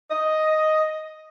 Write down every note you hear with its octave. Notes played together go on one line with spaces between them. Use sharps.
D#5